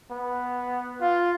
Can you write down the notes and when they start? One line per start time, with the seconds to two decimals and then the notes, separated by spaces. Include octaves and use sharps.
0.11 B3
1.01 F4